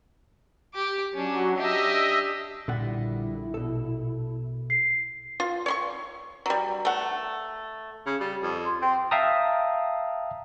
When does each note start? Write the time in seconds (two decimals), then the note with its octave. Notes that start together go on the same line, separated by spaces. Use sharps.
0.74 G4 D6
1.14 F#3 C#4 D4
1.57 D4 G4 D#5 E5
2.68 A#1 A#2 D3 G3 E4 F#5
3.54 B2 A4
4.70 C7
5.40 F4
5.66 C#5 C6 C#6
6.46 F#3 G3
6.85 A3 F#5
8.06 C#3
8.20 G3
8.43 F2
8.66 C6
8.82 C4 G5
9.11 E5 F5 G5 A5 A#5 D#6